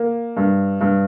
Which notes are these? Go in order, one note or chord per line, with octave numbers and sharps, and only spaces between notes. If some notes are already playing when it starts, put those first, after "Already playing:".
Already playing: A#3
G2
G2